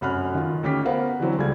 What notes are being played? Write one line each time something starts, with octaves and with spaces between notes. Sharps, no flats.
F1 F#2 F#5 B5 F6 F#6
D#3 F4
D2 C#4 G4 B6
B3 A#4 C5 F5 F#5
D3 E3 F#3 C4
C#2 G3 A3 G#6